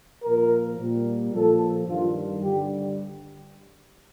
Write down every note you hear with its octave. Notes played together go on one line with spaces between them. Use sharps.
A#2 F3 A#4
A#2 G3
A#2 F3 A4
G2 D#3 G3 F4
G2 D3 G3 G4